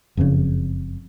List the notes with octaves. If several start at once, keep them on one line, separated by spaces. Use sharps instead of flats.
F#1 F2 G#2 C#3